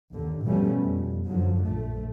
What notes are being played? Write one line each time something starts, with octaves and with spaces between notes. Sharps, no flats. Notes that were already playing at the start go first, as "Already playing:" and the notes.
D#2 D3
B2 F3 G3 A3 C#4
F2
F#2 D3 F3 F#3
A#1 A3